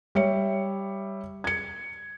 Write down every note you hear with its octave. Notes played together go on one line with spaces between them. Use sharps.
G3 C#5 E5 C#7
G#6 C#7